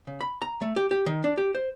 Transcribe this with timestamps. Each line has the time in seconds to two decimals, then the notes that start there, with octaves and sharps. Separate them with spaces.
0.07 C#3
0.21 B5
0.42 A#5
0.62 A3
0.76 G4
0.91 G4
1.06 D#3
1.24 D4
1.38 G4
1.55 C5